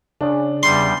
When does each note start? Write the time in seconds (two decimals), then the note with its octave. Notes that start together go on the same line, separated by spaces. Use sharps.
0.21 C#3 D4
0.63 E2 G3 C6